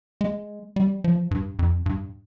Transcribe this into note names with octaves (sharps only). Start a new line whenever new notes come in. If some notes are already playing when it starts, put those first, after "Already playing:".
G#3
G3
F3
G2
F2
G2